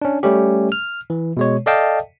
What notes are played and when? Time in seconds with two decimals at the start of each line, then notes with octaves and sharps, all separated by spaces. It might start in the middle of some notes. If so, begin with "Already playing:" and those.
0.02 C#4 D4
0.23 G3 A3 C#4 G4
0.72 F6
1.10 E3
1.37 B2 G#3 C#5
1.66 A4 D5 D#5 F5 G5 A5